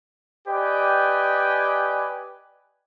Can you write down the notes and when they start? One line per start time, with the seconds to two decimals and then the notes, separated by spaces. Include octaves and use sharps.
0.48 G4 B4 D5 D#5 G5 G#5